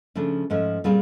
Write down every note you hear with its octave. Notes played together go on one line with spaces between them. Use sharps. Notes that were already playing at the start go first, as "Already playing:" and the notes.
C#3 F3 A3 D4
G#2 F3 A3 C#4
A#2 G3 C4 F4 G#4